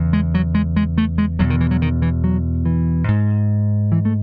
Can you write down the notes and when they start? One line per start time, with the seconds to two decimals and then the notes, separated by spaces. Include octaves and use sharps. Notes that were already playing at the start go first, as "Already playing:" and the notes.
Already playing: E2 C#3
0.13 G#3
0.34 F#3
0.55 G#3
0.76 G#3
0.98 A3
1.18 G#3
1.39 E2 B2 F#3
1.50 D#3
1.60 E3
1.71 F#3
1.82 D#3
2.02 E3
2.24 F#3
2.65 E3
3.08 G#2
3.92 E3
4.05 A3